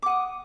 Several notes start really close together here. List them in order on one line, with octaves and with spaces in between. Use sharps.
D6 F#5 D#6